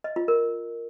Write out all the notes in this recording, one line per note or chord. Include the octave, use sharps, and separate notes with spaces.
D#5
F4
A#4